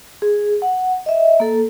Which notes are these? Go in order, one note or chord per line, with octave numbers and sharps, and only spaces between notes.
G#4
F#5
D#5 E5
A#3 A4